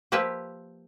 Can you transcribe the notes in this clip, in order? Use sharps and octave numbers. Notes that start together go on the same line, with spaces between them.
F3 A#3 G4 B4 E5